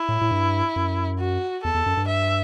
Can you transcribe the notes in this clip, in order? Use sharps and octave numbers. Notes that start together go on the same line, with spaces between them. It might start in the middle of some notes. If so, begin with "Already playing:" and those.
Already playing: E4
A2
A2
G2
F#2
F#4
E2 A4
E2
F#2
G2
E5